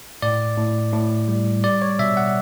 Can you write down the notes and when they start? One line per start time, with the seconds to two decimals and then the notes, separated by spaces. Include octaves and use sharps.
0.22 A2 D5
0.57 A2
0.93 A2
1.28 G3
1.64 G3 D5
1.82 C#5
1.99 B2 E5
2.17 F#5